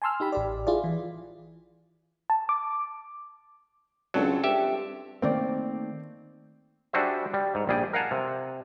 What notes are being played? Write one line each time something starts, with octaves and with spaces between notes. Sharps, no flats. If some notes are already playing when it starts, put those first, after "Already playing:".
G#5 A5 C6 E6 F6
D#4 G4 B5
A1 G4 D5
E4 F4 G#4 D5
E3
A5
D6
C#2 F#3 C4 D4 A4
G2 G4 E5
D#3 A3 A#3 C4 D5
G3 D4 F#4 G#4 C5 E5
G3
G#2
A#1 G3 G#4 G5
A#4 F5 F#5 G#5 A5
C3